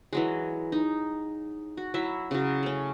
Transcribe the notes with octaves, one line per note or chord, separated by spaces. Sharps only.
E3 F#3 G#3
D#4
F#4
F#3 E4 E5
C#3 F#3
A3 C#4